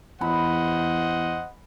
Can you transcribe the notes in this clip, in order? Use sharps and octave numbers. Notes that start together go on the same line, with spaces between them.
E2 C5 D#5 F#5 B5